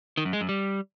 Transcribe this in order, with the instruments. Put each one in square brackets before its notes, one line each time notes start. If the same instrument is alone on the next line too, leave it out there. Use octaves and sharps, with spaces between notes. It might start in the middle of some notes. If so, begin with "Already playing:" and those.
[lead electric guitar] D#3
F#2
G#3
F#2
G3